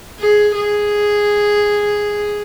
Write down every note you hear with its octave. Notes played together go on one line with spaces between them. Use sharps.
G#4
G#4